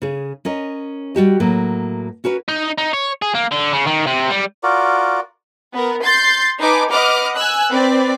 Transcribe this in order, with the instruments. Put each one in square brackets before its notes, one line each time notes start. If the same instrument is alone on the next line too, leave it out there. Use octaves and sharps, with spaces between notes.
[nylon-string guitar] C#3 G#4
C#4 A#4 D#5
G3 F#4 G4 D#5
A2 F#3 A#3
C#4 F#4 A#4 B4
[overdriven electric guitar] D#4
D#4
C#5
G#4
A#3
D3
C#3
D#3
C3
G3
[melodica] F4 F#4 A#4 D5
[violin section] B3 A#4
C6 G6 A6 C7
D#4 B4 G#5 A5 D6
B4 D#5 F#5 D6 F6
G#5 E6 F#6
C4 B4 D5